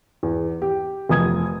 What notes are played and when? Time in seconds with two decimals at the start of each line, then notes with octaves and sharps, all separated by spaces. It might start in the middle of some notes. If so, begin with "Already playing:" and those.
0.23 E2
0.62 G4
1.09 F1 F3 D#6 G#6